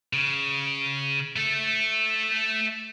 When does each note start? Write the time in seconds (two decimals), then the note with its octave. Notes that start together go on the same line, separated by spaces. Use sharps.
0.13 C#3
1.36 A3 A4